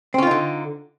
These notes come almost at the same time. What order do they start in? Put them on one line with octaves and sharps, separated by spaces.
C4 C#4 F4 D#4 D3